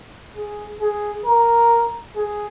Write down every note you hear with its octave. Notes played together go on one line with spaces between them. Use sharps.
G#4
G#4
A#4
G#4